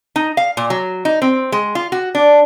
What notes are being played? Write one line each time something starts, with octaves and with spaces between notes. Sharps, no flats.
D#4
F5
A#2
F#3
D#4
C4
G#3
F4
F#4
D4